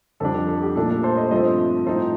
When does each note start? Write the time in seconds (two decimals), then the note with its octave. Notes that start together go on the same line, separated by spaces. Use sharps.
0.20 F2 D3 G3 D4 A4
0.34 A4
0.49 A4
0.62 G4
0.76 A#2 A3 D4 A4
0.90 A4
1.03 A4 C5
1.17 C5 D#5
1.31 G2 F3 A3 C4 C5 D#5
1.87 A2 F3 A3 D#4 A4 C5